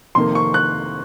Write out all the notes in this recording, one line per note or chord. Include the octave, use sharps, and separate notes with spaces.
F2 C3 D#3 A#3 C6
C#6
F#6